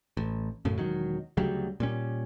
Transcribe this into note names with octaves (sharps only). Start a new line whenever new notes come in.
A1
F#2 A2 C#3
E1 D#3 F#3
D2 C#3 F#3 G3
A#2 G3 C#4